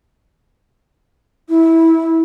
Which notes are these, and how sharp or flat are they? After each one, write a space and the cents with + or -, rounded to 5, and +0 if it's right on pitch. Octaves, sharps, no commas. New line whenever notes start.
E4 -20